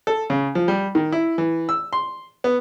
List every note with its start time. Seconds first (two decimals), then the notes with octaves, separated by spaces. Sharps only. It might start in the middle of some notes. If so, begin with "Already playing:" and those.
0.07 A4
0.30 C#3
0.55 F3
0.68 G3
0.95 D#3
1.12 E4
1.38 E3
1.69 E6
1.93 C6
2.44 B3